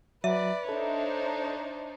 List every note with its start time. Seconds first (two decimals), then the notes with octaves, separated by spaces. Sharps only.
0.24 F#3 B4 D5 E5
0.69 D4 D#4 A4 C5 C#5